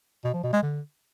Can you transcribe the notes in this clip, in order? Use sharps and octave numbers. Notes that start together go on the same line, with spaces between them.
B2
F3
B2
G#3
D3